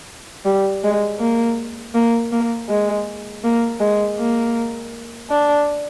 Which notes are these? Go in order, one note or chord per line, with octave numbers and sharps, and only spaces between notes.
G3
G#3
A#3
A#3
A#3
G#3
A#3
G#3
A#3
D4